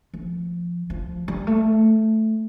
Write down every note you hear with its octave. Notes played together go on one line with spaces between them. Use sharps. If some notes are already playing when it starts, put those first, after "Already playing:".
F3
F3
G3
A3